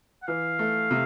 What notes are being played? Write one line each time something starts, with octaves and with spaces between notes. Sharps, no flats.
F#5
E3 F5
A3
C3